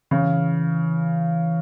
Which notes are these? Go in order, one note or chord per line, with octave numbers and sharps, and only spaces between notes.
C#3 E3